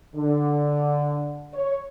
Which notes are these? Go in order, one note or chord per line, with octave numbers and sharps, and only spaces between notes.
D3
C#5